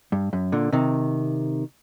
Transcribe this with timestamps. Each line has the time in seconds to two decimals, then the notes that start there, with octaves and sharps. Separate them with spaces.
0.12 G2
0.33 F#2
0.52 A#2 D3
0.72 C3 D#3